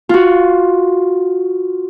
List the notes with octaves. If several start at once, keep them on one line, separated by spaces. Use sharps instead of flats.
F4 F#4